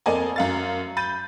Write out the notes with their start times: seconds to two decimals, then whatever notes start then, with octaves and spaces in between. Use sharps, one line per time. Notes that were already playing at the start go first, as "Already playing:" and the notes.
0.06 F2 A#3 A4 D5 D#5 G#5
0.36 F#2 F5 A6
0.97 B5 G6 A6 D#7